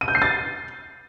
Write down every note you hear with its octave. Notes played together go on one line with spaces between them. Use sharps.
D#7
G6
C7
A6